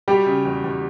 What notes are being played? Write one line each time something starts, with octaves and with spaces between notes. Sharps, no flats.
F#3 G3 G4
C#3
E2
E2